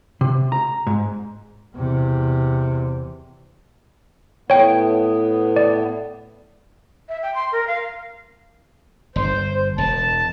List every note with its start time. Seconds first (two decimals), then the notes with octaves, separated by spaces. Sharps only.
0.21 C3
0.52 A#5
0.87 G#2
1.76 E2 C3
4.50 A2 B3 C#5 G5
5.56 D5
7.09 E5
7.23 G5
7.35 C6
7.52 A#4
7.67 F5
9.16 G1 C5
9.78 E1 A5